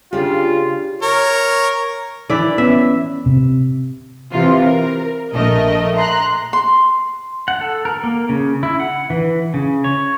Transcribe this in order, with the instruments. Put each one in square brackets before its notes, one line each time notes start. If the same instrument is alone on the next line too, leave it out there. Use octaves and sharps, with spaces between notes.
[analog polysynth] C#3 [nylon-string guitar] D4 G4 [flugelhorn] F4
[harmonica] A#4 C#5
[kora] E3 E4 D5
[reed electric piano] B3 C#4 [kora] E5
[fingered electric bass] C3
[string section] C3 E3 F4
A#4
A#1 A3 A#4 D#5
A#5 C6 F#6
[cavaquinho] C6
[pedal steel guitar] F#5
A4
A#4
A#3
C#3
E4
F#5
E3
C#3
C#5